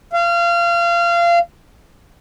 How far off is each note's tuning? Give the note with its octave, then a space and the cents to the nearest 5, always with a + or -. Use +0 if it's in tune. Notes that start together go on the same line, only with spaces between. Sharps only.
F5 -25